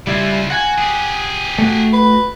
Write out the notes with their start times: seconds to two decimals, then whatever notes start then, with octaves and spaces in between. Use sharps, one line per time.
0.07 C#3 G3 E4 F4
0.50 F#4 F#5 G#5
0.78 G4 G#4
1.59 A3 F#4
1.93 B4